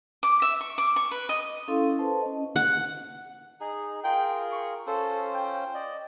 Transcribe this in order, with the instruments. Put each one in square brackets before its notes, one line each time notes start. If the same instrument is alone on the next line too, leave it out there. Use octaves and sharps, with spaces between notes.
[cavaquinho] D6
E5
C#6
D6
C#6
B4
D#5
[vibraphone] C#4 E4 A4 F5 C6
B4 C5 A5
C#4 D#5
[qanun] F#5
[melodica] D#4 G#4
[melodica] F4 G#4 A#4 [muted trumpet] G5
[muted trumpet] C#6
[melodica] C#4 F4 C5 [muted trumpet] A4
[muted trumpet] G5
[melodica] D5 D#5